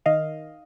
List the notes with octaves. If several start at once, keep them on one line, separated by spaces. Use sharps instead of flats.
D#3 D#5 F5